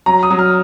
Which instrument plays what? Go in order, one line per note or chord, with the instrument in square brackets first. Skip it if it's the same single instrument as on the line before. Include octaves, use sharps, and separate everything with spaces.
[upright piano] F#3 [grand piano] A#5
[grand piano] D#6
[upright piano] F#3
[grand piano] F6